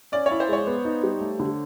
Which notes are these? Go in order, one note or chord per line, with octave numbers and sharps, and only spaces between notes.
C#4 D5
C#5
E4
C5
G#3 C#5
B3
D#4
G3
A3
D3